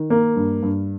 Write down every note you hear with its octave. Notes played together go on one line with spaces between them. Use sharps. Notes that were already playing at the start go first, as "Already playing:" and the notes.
Already playing: D#3
A#3
G2
G2